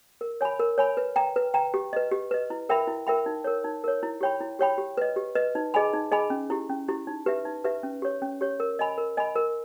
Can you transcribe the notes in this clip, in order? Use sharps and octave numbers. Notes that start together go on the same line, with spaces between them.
A#4
C#5 G#5 B5
A#4
C#5 G#5 B5
B4
G5 A#5
B4
G5 A#5
G4
B4 D#5
G4
B4 D#5
E4
A#4 E5 G5 B5
E4
A#4 E5 G5 B5
D#4
A#4 C#5
D#4
A#4 C#5
E4
G4 C#5 G5 B5
E4
G4 C#5 G5 B5
G4
B4 D#5
G4
B4 D#5
D#4
G#4 D#5 G#5 B5
D#4
G#4 D#5 G#5 B5
C#4
E4 G4
C#4
E4 G4
D#4
G4 B4 E5
D#4
G4 B4 E5
C#4
G4 C#5
C#4
G4 C#5
A#4
D#5 G#5 B5
A#4
D#5 G#5 B5
A#4